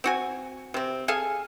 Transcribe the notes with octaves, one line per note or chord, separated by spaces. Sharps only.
C4 F#4 G#5
C3 C4
G#4 A4 F5 G#5